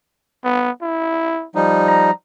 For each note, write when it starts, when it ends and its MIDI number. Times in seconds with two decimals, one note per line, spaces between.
0.44 0.71 59
0.82 1.46 64
1.55 2.11 53
1.55 2.11 55
1.55 2.11 63
1.87 2.13 82